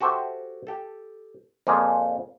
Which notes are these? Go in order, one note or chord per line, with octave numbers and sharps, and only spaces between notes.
F#4 G4 A4 C5 E5
G4 A4
F2 A#2 F3 A#3 D#4 G#4